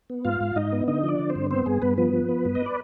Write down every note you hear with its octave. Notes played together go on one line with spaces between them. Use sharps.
B3
G#2 F4 F5
G#2
G#2 D#4 D#5
B3
D3 D#4 D#5
F3 D4 D5
D3
C4 C5
G2
B3 C4 C5
G2 G#4
G2 B3 B4
F3 B3 B4
F3
B3
G2
D#5
D5